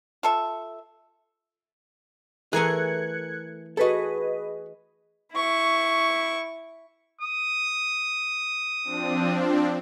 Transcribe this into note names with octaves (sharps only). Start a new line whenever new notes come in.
F4 A4 E5
E3 A3 G#4 A#4 G#5 F#6 G#6 C#7
F#4 G#4 A4 B4 D#5
E4 C#6
D#6
F3 C4 D4